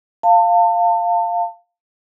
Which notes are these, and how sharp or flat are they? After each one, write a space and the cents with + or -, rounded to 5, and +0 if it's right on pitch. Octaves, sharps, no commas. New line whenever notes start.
F5 +0 A5 +30